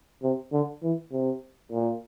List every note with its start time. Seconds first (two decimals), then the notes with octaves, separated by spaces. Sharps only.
0.23 C3
0.52 D3
0.83 E3
1.12 C3
1.72 A#2